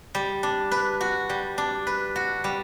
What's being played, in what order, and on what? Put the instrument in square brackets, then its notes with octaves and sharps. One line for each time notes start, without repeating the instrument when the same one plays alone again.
[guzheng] G3
D4
B4
F#4
G3
D4
B4
F#4
G3